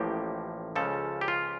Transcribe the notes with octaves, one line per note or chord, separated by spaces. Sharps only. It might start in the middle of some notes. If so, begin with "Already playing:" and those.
Already playing: A1 A2 F3 A#3 G4
C#2 C#3 F3 A4
G4
F4